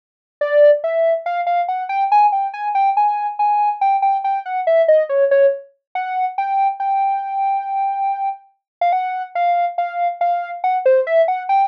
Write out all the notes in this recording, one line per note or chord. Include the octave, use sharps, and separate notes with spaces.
D5
E5
F5
F5
F#5
G5
G#5
G5
G#5
G5
G#5
G#5
G5
G5
G5
F#5
E5
D#5
C#5
C#5
F#5
G5
G5
F5
F#5
F5
F5
F5
F#5
C5
E5
F#5
G5